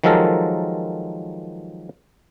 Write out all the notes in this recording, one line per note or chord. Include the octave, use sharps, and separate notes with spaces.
D#3 F3 F#3 G#3 A4 A#4